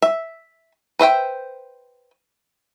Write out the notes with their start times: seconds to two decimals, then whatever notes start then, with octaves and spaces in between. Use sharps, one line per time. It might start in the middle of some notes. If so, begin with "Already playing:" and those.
0.02 E5
0.99 B4 C5 E5 G5